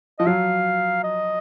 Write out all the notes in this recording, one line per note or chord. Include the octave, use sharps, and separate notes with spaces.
F3 D#5
F#3 F5
D#5